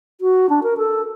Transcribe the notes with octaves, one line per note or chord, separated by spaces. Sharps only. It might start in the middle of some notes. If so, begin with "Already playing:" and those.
F#4
D4
A#4
A4